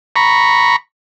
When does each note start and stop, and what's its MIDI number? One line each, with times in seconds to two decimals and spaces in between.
0.16 0.76 82
0.16 0.76 83
0.16 0.76 85